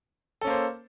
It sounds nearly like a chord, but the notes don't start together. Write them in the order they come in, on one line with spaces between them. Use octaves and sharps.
A4 C#4 A#3 C5